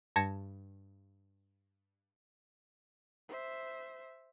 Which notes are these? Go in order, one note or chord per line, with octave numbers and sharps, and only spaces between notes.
G2 A5 G#6 A#6 C#7
C5 E5